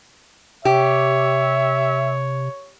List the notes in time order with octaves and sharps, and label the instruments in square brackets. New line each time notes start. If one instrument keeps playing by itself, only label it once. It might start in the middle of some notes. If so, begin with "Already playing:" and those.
[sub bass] C3 [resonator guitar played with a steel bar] G4 [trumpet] C#5 [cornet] E5